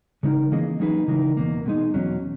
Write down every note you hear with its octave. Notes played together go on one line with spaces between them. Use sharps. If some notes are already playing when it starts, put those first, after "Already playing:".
C#3 G#3 D#4 A#4
E3 A#3 C#4 G#4 D#5
F#3 A#3 D#4 G#4 B4
C#3 E3 G#3 D#4 A#4
E2 B2 A#3
B2 G#3 D#4
E2 B2 F#3 C#4